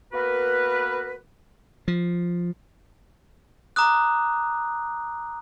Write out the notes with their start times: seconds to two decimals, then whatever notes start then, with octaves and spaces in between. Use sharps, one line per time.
0.13 A#3 B3 F#4 A#4 B4
1.88 F3
3.76 A#5 D6 D#6 F#6